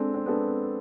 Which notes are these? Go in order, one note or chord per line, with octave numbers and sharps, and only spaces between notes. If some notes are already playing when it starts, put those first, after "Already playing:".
Already playing: G#3 C4 D4 A4
C4
G#3 B3 D4 A4